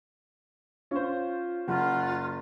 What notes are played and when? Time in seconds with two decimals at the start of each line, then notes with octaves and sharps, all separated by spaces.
0.91 C#4 F4 C5
1.68 F#1 F4 F#5